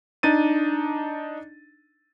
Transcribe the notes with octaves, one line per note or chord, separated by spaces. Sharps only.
D4 D#4 A6 D#7